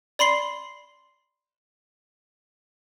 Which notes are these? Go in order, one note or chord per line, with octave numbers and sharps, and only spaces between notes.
D5 B5 C6 C7 G7